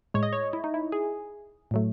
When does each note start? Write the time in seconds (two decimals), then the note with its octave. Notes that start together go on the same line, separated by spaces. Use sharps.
0.14 A2 G#3 C#5
0.23 D#5
0.33 C#5
0.53 E4
0.64 D#4
0.74 E4
0.92 G#4
1.71 A2 F#3 A3